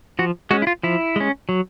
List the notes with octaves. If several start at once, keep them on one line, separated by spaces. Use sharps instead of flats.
F3 F#4
G#3 C#4 F#4
E4
F4
F3 E4
G#3 C#4
F#3